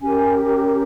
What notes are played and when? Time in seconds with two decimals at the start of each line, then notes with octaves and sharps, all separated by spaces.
0.02 C#4 G4 A#4 G#5